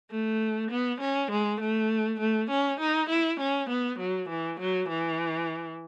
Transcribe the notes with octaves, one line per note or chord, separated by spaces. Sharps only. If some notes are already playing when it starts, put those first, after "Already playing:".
A3
B3
C#4
G#3
A3
A3
C#4
D#4
E4
C#4
B3
F#3
E3
F#3
E3